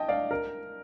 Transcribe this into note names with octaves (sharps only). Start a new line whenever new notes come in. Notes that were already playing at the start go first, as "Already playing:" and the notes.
Already playing: D#5 G5 A5
D5 F5
A#4